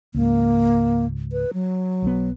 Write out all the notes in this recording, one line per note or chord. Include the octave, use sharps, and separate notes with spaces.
C#2 G#2 A#3
B4
F#3
B1 E3 B3